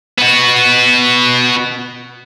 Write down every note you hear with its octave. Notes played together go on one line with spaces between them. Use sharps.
B3 F#4